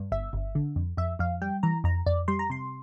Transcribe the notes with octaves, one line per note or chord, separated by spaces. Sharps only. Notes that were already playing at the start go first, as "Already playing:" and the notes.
Already playing: G2
G1 E5
G1
D3
F2
F2 E5
F2 F5
G3 G5
E3 A#5
F2 A#5
F2 D5
G3 C6
A#5
C3 C6